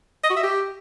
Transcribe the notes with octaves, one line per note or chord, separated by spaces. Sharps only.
D#5
F#4
E5
G4